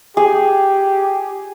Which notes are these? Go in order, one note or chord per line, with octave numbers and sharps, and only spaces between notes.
G4 G#4